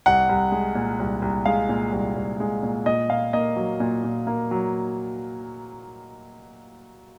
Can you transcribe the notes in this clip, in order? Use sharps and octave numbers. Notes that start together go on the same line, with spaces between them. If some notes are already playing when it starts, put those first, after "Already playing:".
C2 F#5
C2
G#3
A#2
C2
C2
G#3 F5
A#2
C2
C2
G#3
A#2
A#2 D#5
A#2 F5
A#3 D#5
F#3
A#2
A#2
A#3
F#3